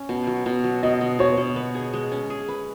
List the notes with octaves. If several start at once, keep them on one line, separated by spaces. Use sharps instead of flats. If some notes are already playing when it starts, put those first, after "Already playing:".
Already playing: C#4
B2
F#3
B2
F#3
B2 D#5
B2
B2 C#5
B2
B4
G#4
G#3
C#4
G#4
B4